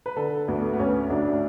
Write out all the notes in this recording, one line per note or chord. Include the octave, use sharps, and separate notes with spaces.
B4
D3 A4
D2 B3
B3
D2 C#4
D2 D4